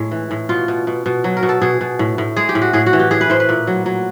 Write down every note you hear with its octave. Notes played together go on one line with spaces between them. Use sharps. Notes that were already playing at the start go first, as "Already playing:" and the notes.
Already playing: A2 G#3
E3
A2
B2 F4
B2
B2
B2
F#3
A#4
B2
A4
B2 G#4
B2
A2
A2
G#3 G#4
G4
A2
F#4
A2 G#4
F#4
E3
G4
A2 G#4
B4
A2 C5
B4
A#2
F#3
F#3